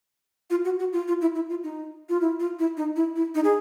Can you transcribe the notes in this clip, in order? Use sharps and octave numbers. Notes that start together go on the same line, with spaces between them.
F4
F#4
F#4
F4
F4
E4
E4
F4
D#4
F4
E4
F4
E4
D#4
E4
E4
D#4
G#4